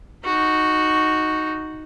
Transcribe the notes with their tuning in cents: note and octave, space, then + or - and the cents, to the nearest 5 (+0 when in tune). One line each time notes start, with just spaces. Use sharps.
D#4 +0 F#4 +0